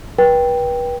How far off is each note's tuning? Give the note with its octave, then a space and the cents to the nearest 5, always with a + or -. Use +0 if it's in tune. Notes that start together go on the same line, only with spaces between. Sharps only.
B4 -30 G5 +5